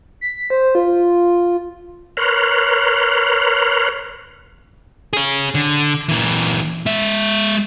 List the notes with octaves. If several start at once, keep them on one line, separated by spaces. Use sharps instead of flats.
B6
C5
F4
A#4 B4 C#5 C6 F6 F#6
G#4 C#5
D3
A#2 E3
G#3 E5